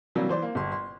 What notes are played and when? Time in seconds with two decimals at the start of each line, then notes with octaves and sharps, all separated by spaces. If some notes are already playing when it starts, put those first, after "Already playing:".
0.15 C3 E3 F#3 G3 A#3
0.29 E3 C5 D5
0.42 A#3
0.55 G1 C6
0.72 C6